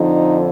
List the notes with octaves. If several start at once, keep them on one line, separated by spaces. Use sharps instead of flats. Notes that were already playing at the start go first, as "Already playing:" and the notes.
Already playing: F2 D3 F3 D#4